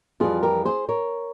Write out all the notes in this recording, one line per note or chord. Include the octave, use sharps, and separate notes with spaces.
F2 E3 G3 F4 G#4
G4 A#4
G#4 C5
A#4 C#5